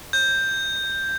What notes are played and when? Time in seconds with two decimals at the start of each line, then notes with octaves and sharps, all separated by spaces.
0.13 G6